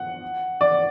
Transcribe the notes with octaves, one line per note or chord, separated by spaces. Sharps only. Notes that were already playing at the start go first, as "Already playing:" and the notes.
Already playing: F#5
D5